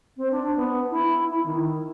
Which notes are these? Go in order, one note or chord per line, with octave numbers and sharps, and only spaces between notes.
C4
D4
B3
E4
E4
D#3